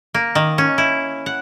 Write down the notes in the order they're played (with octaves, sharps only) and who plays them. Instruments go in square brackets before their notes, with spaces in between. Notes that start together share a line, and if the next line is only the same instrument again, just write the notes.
[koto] A#3
D#3
C#4
E4
F#5